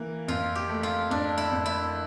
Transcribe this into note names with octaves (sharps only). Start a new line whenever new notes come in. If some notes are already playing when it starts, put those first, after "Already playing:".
Already playing: E3 A#3
F2 F4
G4
A3
F4
F2 D4
E4
F2
E4